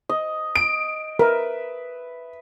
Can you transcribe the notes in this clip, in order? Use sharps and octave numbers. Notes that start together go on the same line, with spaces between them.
D#5
D7
A#4 B4 E5